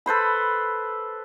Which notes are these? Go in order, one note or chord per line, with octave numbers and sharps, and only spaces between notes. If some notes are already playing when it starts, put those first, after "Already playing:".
A4 B4 C5 B5